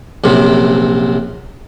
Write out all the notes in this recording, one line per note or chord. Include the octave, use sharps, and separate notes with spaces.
A#1 F#2 C3